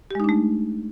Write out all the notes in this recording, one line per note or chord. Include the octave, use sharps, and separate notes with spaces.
G#3 A3 D4 D#4 G4